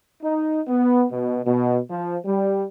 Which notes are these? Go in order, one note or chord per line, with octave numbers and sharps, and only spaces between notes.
D#4
B3
B2
B2
F3
G3